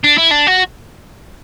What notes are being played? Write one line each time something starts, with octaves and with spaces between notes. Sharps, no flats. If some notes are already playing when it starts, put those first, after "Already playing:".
D4
E4
D4
F#4